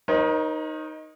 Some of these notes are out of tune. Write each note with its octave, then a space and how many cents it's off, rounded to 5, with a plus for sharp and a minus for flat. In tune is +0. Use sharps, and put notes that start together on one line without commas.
D#4 +0 A#4 +35 C#5 -45